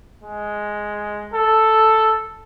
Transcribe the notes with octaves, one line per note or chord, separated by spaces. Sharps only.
G#3
A4